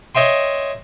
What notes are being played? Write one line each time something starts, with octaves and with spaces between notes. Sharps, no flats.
C#5 D#5 E5 G5 C6